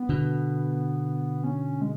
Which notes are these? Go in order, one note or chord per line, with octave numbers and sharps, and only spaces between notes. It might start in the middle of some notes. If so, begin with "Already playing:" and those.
Already playing: B3
B2 D3
C#4
G#3